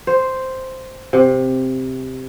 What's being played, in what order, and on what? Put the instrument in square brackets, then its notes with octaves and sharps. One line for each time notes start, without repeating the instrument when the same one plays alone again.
[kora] C5
C3